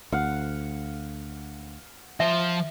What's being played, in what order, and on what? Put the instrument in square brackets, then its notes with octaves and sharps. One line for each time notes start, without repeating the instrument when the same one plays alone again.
[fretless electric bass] D2 [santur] F5 F#5
[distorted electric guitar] F3 [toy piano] E5